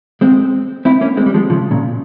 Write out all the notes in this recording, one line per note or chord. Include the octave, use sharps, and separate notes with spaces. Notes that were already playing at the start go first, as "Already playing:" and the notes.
G#3 C4
C4 E4
A#3 C#4
G#3 C4
G3
F3 G#3
C#3 F3
A#2 C#3